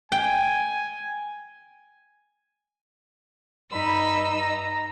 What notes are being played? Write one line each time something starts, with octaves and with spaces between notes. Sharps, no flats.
G5 G#5
G2 D#4 B5 E6
A#5